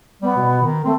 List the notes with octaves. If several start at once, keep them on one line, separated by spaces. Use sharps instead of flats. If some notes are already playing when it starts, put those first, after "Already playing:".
G3 B3
B2
D#3
A3 C4